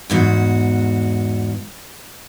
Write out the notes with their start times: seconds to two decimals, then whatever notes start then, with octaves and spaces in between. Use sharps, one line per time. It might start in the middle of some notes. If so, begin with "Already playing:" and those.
0.10 E2 G#2 F#4